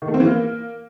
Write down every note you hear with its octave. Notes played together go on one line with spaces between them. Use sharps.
D#3
A3
C4
E3
A#3